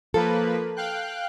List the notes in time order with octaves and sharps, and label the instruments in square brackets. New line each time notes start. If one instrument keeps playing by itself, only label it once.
[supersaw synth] F3 A#3 B4 [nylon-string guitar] A4
[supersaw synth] F5 G5 F#6